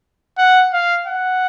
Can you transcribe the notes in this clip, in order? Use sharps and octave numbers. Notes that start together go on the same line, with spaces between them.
F#5
F5
F#5